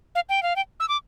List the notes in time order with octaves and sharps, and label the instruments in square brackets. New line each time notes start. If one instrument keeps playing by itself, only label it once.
[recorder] F5
G5
F5
G5
E6
D6